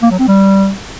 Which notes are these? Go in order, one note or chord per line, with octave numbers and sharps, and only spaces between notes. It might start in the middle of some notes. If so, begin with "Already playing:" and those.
A#3
F#3
C4
G3